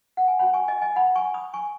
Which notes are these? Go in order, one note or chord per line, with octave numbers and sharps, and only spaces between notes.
F#5
G#5
C#4 F#4 C#5 F#5 B5
G#5 C#6
D#5 G#5
D#5 G#5
F#5 B5
G#5 C#6
B5 D#6
G#5 C#6